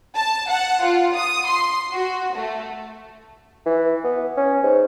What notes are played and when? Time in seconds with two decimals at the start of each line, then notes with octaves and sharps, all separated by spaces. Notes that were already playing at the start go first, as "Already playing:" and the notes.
0.16 A5
0.50 F#5
0.83 F4
1.17 D#6
1.46 C6
1.93 F#4
2.35 A3
3.66 E3
4.04 B3
4.37 C#4
4.63 G#2